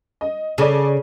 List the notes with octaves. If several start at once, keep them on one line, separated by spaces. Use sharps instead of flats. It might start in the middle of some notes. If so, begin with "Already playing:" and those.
D#5
C#3 A4 D5